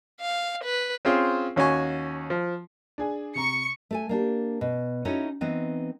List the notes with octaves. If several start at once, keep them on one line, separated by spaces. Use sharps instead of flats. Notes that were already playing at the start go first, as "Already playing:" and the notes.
F5
B4
C4 C#4 F4 G#4 C5
D#2 C#4 F#4 G#5 C#6
F3
D4 G#4 G#5
C3 A#5 C#6 C#7
A3 A4 G#5
A#3 D4 G4
B2
C#4 D#4 E4 F#4 A4 C#5
E3 B3 C4 D#4